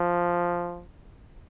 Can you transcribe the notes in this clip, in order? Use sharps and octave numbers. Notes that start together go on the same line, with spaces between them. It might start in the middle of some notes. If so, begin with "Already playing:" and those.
Already playing: F3